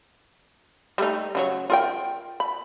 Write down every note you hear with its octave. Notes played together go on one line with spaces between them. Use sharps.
G3 A3 D#4
C#3 F#3 C#5
F4 A#4 G5
B5